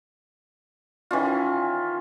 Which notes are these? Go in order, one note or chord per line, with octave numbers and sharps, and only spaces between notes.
D#3 E3 C#4 F4